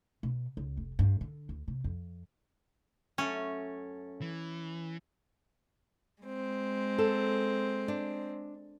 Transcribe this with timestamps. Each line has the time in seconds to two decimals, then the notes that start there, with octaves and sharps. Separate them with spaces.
0.23 B2
0.57 C#2
0.77 F1
0.99 G2
1.21 D3
1.49 D2
1.68 C3
1.84 F2
3.18 F#2 A3 C#4
4.21 E3
6.22 G#3 C4
6.99 A4
7.88 D4